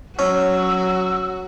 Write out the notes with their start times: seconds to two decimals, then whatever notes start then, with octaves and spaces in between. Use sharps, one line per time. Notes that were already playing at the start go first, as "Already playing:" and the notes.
0.19 F#3 C#4 F#4 E6